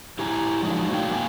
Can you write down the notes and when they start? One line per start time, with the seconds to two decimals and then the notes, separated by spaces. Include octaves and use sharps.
0.19 E4 G4 G#5 A#5
0.63 F3 F#3 G#3 D4 D#4
0.90 F#3 A3 D5 F5 G5
1.10 A#3 G4 A#4 F5 G#5